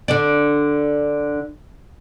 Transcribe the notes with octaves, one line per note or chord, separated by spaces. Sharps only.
D3 D4 D5